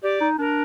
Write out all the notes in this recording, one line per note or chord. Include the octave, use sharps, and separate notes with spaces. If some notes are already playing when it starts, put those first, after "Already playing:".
G4 D5
D#4
D4 A#4